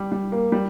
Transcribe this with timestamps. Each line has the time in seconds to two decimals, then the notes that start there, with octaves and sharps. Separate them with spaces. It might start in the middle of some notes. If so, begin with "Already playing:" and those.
Already playing: G3
0.12 G3
0.32 A#3
0.52 G3